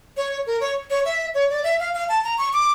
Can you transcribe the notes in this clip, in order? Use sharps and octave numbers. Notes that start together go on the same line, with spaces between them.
C#5
A#4
C#5
C#5
E5
C#5
D5
E5
F5
F5
A5
A#5
C#6
D6